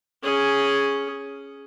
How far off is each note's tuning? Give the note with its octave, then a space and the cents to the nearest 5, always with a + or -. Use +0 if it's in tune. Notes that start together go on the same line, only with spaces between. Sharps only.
C#4 +0 G#4 +0